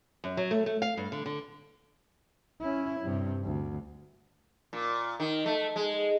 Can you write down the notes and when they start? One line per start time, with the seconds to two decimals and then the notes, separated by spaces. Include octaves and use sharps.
0.24 F#2
0.37 F#3
0.51 A3
0.66 A3
0.82 F5
0.97 G2
1.12 D3
1.26 D3
2.61 C#4 E4
3.02 G2 C3
3.45 D2
4.73 A#2
5.20 D#3
5.46 A3
5.76 G#3